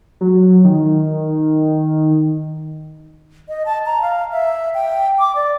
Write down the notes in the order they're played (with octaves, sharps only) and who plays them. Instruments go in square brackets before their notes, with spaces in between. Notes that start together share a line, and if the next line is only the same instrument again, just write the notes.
[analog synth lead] F#3
D#3
[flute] D#5
A5
A#5
F5
E5
G5
D6
D5